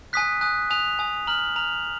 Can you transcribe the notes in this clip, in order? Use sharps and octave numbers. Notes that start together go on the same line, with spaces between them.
G#5 D#6 F#6 B6
G#5 D#6 F#6
G#5 D#6 F#6 F7
G#5 D#6 F#6
A#5 F6 F#7
A#5 F6 F7